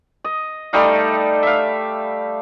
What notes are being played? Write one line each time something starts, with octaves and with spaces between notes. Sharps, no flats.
D#5
G3 A3 D#4 F5
E5 F5